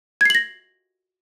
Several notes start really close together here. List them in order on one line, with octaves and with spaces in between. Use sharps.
G#6 C7 F#7 A#6